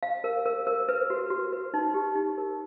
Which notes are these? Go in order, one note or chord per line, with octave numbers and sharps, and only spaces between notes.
F5
A#4
A#4
A#4
B4
F#4
F#4
B4
D#4
G4
D#4
A#4